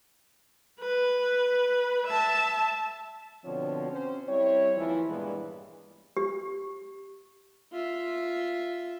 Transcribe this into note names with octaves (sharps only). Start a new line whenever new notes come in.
B4
E5 A5
B2 D3 F3 C4 F#4 C#5
C4 C#4 C5
G3 C4 E4 C#5
D#2 E3 F3 E4
G2 A#2 E3 G#3 B3
G4
F4 E5